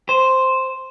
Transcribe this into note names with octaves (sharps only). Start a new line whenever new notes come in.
C5